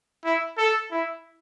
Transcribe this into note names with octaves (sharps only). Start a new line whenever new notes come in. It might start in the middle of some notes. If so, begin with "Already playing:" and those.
E4
A4
E4